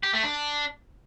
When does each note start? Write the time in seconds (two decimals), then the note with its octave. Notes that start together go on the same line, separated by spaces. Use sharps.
0.03 G4
0.13 A3
0.24 D4